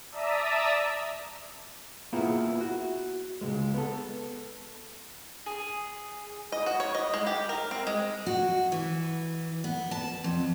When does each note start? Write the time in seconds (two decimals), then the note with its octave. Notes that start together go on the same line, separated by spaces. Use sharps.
0.11 D5 E5 A5 A#5 D#6 E6
2.13 A#3 B3 E4 F4 G#4
2.61 F#4
3.41 C#2 F#2 G#3
3.74 B3 A4
5.46 G#4
6.52 D#5
6.66 F#4
6.80 C#5
6.95 D#5
7.14 G#3
7.27 G4
7.49 A#4
7.71 C4
7.87 G#3
8.26 F#4
8.72 E3
9.64 B3
9.91 A5
10.24 F2